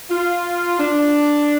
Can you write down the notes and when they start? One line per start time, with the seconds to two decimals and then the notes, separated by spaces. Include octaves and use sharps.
0.10 F4
0.79 D4